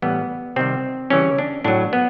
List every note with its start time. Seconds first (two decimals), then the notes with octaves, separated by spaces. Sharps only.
0.02 A2 E3 G3 B3
0.56 C3 D#3 G3 C4
1.10 C#3 E3 G3 C#4
1.39 D4
1.64 A2 F#3 D4
1.93 B3